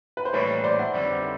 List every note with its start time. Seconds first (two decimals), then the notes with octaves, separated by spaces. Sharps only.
0.17 B4
0.25 C5
0.33 A2 E3 G3 A#3 D4 B4 C#5
0.64 C5 D5
0.79 E5 F#5
0.94 F2 D3 G3